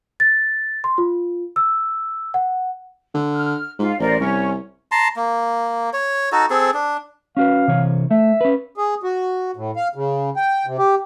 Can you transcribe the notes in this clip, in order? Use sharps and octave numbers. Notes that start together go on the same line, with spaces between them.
A6
C6
F4
E6
F#5
D3
F6
G#2 F4
A1 A#4 C5 D5
C2 C#4 C#5 C#6
A5 A#5 C6
A#3
C#5
D#4 F#4 A4
C4 G#4 A4
D4
C#4 F#4 B4 F5
C3 E3 C#5
A3 E5
C#4 B4
G#4
F#4
A2
F5
C#3
G5
C3
G4